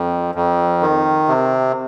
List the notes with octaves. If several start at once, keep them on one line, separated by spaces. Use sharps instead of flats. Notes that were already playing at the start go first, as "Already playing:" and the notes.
Already playing: F2
F2
D#3
C3